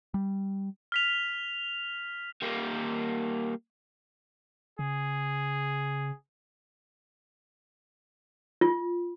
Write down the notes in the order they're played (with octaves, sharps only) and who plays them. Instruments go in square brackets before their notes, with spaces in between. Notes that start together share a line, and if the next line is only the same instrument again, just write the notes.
[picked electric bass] G3
[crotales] F6 B6 F7
[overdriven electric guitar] G3 A#3
[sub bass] C#3 [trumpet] G#4
[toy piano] F4